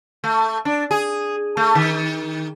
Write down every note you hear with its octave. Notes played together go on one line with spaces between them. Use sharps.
A3
D4
G#4
A3
D#3